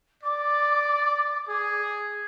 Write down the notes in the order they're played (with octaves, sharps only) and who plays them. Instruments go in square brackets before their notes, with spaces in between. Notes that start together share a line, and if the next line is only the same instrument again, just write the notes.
[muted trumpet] D5 [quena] D6
[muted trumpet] G#4